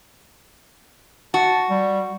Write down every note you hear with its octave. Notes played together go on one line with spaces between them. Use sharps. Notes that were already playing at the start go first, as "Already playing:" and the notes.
F#4 A5
G3